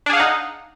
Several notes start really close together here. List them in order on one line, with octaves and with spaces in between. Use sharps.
D4 G#4 F5 F#5 D#4